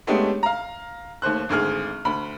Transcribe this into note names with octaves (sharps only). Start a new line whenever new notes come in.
G#3 A3 B3 C#4 D4 G4
F5 A#5
D#2 A3 C5 F#6
G#1 D2 G#4 F6
D2 B5